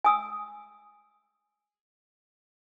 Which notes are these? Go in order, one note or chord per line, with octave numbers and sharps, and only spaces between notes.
G#5 D#6 E6